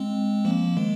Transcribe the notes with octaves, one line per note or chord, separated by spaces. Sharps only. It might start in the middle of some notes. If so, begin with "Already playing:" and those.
Already playing: G#3 C4
F3 A#3
D#3 G#3